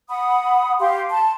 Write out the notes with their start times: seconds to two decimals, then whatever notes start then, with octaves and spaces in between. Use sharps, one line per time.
0.09 F#5 B5 D#6
0.80 G4 F5 C6
1.10 A5 C6